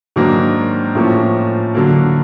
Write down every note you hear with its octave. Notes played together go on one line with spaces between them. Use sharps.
G#2 D#3 F#3 A#3 D4
A2 F3 A#3 C#4
D3 F#3 A#3